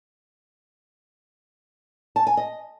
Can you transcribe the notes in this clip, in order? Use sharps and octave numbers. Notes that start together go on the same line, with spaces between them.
A5
G#5
D#5